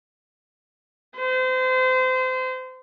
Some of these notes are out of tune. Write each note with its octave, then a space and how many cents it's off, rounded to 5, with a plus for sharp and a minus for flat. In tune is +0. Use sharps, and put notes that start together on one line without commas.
C5 -30